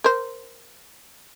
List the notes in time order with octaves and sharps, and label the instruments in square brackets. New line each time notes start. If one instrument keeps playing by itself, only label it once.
[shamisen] A#4 C5